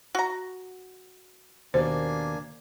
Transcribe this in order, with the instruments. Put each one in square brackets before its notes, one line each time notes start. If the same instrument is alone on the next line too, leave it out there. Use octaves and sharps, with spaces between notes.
[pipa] F#4 A#5
[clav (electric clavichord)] D#2 B2 [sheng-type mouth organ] A#3 D4 G#5 [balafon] C5